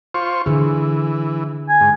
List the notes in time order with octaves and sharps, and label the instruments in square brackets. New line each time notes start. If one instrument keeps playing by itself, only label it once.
[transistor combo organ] F4 C5 C#6
[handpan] D3 G#4 [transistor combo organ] E3
[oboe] G#5
[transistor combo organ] G#2